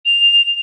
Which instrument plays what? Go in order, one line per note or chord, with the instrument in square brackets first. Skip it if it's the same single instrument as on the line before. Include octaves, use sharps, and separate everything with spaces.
[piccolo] F7